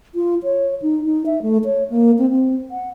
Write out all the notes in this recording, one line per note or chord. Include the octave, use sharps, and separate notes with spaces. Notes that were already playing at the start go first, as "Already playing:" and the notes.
F4
C#5
D#4
D#4
E5
A3
C#5
A#3
C4
C4
F#5